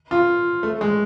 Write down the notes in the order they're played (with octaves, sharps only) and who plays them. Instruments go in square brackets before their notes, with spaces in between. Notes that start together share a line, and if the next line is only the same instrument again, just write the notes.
[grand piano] F4
A3
G#3